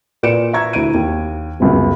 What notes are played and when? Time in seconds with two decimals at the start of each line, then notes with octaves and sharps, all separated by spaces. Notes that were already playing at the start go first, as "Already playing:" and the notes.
0.23 A#2 B4 D5 C#7 D7 E7
0.53 E5 A#5 C#6 G#6
0.73 D2 E4 D7 D#7
0.94 D#2
1.60 G1 C#2 F#2